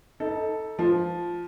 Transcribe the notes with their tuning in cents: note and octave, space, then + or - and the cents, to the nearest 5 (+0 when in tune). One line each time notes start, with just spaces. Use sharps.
D#4 +25 A4 +0
F3 +0 F4 +0